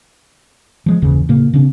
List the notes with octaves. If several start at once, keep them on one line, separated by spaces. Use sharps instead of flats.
F3 G#3
F#1 D#2 C#3 E3
A2 C#3 A#3
C#3 C4 D4